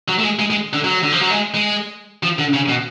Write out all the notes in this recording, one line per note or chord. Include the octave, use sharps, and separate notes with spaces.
F#3
A3
G#3
G#3
G#3
D3
F#3
D3
F3
F#3
G#3
G#3
F3
D3
C#3
B2